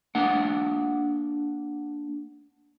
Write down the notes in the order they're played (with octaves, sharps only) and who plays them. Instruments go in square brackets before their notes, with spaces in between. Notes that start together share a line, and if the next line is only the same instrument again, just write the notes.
[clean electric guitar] A#3 D4 F#5